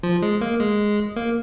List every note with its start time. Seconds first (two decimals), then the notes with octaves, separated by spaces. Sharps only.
0.03 F3
0.23 G#3
0.41 A#3
0.60 G#3
1.16 A#3